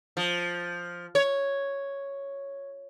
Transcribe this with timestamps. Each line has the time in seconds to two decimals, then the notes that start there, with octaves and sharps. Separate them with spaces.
0.17 F3
1.15 C#5